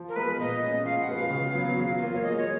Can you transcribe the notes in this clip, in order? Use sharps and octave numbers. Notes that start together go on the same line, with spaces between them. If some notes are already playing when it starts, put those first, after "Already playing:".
Already playing: F3
A#4
G#3 B3 B4
A#2 D#5
G#3 C#4 G#4
F3 F5
F#5
G#3 C#4 F#4 B4
F5
C#3
F#3 B3
F#3
A#3 F4
C#5
G#3 D#5
C#5